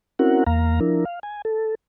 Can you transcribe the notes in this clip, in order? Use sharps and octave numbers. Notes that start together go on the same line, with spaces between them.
C4 C#4 E4 F#4 A#4 F#5
E2 A#3 F5 A#5
F3 D4 E4 A#4
F5
G#5
A4